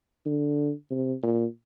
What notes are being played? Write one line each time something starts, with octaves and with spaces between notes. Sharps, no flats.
D3
C3
A#2